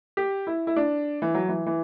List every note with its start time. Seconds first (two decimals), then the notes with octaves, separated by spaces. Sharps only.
0.17 G4
0.47 E4
0.67 E4
0.76 D4
1.22 E3
1.35 F#3
1.49 E3
1.66 E3